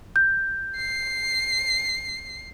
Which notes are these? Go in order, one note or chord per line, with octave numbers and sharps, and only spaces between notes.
G6
C7